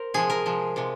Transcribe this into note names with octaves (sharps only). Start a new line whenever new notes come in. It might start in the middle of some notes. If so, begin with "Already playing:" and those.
Already playing: A#4 C5
C3 F3 G#3 G#4
A#4
C3 F3 G#3
C3 F3 G#3